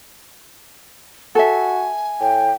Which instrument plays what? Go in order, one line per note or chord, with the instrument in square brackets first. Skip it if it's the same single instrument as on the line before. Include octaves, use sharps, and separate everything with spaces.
[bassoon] F#4 [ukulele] A4 E5 [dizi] G#5
[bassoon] A2 [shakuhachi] G5